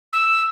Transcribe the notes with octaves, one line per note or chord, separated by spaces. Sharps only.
E6